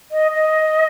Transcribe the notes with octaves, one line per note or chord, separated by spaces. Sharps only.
D#5
D#5